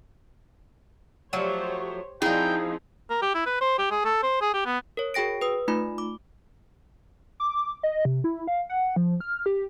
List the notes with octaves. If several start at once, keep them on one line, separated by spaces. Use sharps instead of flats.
F3 F#3 A3 G4 C5 C#5
F3 C4 D#4 E4 G#4 F5 G5 A#5
A#4
G4
E4
B4
C5
G4
G#4
A4
C5
G#4
G4
B3
A#4 C#5
F#4 G#4 G5 A#6 D7
B4 D#6
A3 D#4 F4 B5
D6
D6
D#5
C3
E4
F5
F#5
F3
F6
G4